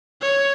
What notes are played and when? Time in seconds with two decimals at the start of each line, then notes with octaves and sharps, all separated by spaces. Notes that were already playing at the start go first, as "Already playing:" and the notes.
0.21 C#5